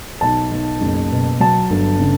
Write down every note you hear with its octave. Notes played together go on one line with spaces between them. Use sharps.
B1 A5
B1
F#1
B2
F#3 A5
G1
C#3